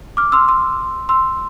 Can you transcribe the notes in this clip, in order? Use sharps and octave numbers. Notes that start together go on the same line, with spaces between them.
D6 F6
C6 E6
C6 E6
C6 E6